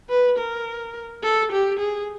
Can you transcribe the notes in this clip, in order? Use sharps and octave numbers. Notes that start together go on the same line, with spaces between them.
B4
A#4
A4
G4
G#4